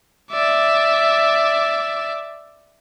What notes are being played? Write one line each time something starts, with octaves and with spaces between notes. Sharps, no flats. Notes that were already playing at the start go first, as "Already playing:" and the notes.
D5 E5